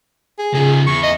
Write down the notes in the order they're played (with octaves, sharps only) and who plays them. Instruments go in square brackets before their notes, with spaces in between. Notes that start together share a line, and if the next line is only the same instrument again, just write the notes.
[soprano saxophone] G#4
[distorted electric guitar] C#3 F3 [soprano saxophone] G#4
[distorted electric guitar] E2 [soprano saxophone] C#6
[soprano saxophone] D#5